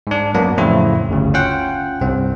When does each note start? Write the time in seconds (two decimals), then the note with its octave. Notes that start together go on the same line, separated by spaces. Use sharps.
0.07 G#2 D4
0.34 F#2 F#3 A#3 B3 D4
0.57 F2 A2 C#3 C4 E4
1.09 G1 D2 C#3
1.34 C#4 F4 F#5 G5
2.01 C2 G2 C4